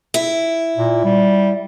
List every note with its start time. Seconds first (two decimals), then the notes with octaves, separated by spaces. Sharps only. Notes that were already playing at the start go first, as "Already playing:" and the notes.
0.14 E4
0.77 A#2
1.04 G3